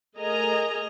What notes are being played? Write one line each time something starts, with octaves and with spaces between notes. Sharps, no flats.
A3 G#4 A#4 D#5 G#5 A#5